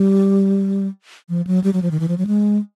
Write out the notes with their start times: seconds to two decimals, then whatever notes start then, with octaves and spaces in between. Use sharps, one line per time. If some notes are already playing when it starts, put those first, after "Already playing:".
Already playing: G3
1.29 F3
1.47 F#3
1.64 G3
1.73 F#3
1.82 F3
1.91 D#3
2.00 E3
2.08 F3
2.18 F#3
2.27 G#3